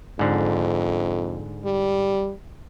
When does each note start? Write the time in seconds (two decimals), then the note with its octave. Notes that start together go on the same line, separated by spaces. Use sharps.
0.19 F2 G#2 D3
1.65 G3